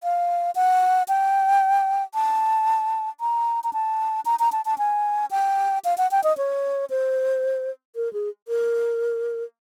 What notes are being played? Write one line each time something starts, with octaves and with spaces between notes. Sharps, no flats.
F5
F#5
G5
A5
A#5
A#5
A5
A#5
A#5
A5
A5
G#5
G5
F5
F#5
G5
D#5
C#5
C5
A#4
G#4
A#4